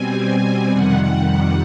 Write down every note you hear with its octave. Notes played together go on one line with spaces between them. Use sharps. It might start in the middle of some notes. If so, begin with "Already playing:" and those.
Already playing: B2 G3 C4 G#5
G#5
F2 C3 D#3 G3 F#5